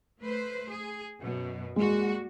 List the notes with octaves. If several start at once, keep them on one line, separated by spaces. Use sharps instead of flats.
A3 B4 C5
G#4
F#2 B2
G3 G#3 A#3 F#4